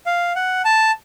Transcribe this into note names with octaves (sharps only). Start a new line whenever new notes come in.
F5
F#5
A5